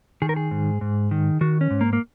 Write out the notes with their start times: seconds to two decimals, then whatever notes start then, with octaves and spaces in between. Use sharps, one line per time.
0.22 D#3 G#4
0.29 A#4
0.36 G#4
0.51 G#2
0.81 G#2
1.11 D#3
1.41 D#3 F#4
1.61 C#4
1.70 G#2
1.81 A#3
1.93 A#3